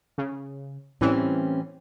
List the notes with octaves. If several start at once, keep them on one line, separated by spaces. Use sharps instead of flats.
C#3
A2 E3 G3 C4 C#4